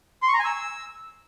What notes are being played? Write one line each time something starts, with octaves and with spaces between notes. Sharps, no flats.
C6
C#6
A#5
G#5
E6